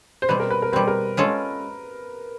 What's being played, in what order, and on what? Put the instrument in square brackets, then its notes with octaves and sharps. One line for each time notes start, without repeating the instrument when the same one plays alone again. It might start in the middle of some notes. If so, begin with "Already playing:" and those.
[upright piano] C5
[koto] B2 G3 C4 [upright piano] B4
[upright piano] A#4
B4
A#4
[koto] B2 G3 C4 [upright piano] B4
[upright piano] A#4
[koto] G#3 C#4 F4 A4